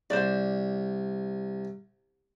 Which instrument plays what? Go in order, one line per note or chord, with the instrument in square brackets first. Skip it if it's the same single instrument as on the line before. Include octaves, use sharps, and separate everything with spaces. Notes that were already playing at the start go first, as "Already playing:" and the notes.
[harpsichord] C2 [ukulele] C5 D5